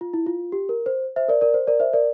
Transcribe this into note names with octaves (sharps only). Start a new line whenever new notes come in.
F4
E4
F4
G4
A#4
C5
C5 E5
A#4 D5
A#4 D5
C5
A#4 D5
C5 E5
A#4 D5